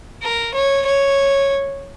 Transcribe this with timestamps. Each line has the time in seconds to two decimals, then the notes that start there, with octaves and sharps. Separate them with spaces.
0.23 A#4
0.54 C#5
0.86 C#5